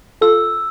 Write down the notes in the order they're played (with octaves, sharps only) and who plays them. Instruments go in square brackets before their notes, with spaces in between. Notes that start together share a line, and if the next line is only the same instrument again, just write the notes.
[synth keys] F4 A4 [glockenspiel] E6